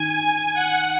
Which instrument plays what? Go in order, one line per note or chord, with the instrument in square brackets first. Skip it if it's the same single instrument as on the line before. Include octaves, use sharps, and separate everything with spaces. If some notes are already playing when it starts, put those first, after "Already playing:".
Already playing: [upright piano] D#3 [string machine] G#5
[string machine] F#5